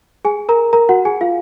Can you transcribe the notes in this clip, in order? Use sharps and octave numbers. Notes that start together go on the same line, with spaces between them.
G#4 G#5
A#4 A#5
A#4 A#5
F#4 F#5
G#4 G#5
F4 F5